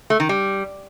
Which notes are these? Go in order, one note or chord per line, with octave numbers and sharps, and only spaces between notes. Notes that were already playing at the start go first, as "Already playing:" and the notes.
A3
D#3
G3